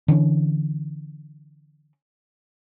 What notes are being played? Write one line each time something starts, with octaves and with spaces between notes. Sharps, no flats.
D3 E3 C#4